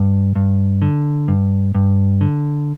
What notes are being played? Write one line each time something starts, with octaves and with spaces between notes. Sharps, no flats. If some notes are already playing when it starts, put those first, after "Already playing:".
Already playing: G2
G2
D3
G2
G2
D3